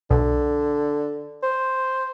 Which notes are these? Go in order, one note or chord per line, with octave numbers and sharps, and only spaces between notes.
B1 D3
C5